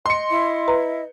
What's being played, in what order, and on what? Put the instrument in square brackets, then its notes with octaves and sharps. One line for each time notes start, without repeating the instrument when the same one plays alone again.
[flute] D#5 [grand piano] C6 C#7
[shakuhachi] E4
[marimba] B4 A#5